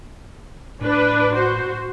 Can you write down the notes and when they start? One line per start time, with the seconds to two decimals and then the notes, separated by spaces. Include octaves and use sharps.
0.81 A2 D4 B4
1.34 F#4 C5